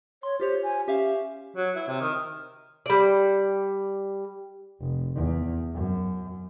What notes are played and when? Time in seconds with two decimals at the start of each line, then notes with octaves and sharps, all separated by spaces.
0.23 C#5 C6
0.40 F4 G4 C5 C#5
0.63 G#5
0.88 C#4 G4 E5 F5
1.56 F#3
1.76 E4
1.88 C3
2.00 D#3
2.86 G3 D5
4.80 F1
5.15 E2
5.74 F#2